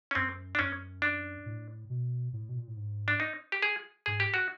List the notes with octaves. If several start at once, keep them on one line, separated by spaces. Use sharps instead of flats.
C#4
F#2 C4
D4
F#2 C#4
D4
A2
B2
A2
B2
A#2
A2
G#2
D4
D#4
G4
G#4
G#2 G#4
G4
F#4